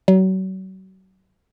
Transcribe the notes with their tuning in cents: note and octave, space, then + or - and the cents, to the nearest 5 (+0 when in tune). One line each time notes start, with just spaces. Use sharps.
F#3 +35